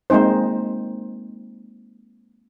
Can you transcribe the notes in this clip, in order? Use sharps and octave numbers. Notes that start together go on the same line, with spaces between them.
G#3 A#3 C4 D#4 C5